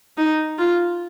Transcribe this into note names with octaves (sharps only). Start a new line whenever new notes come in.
D#4
F4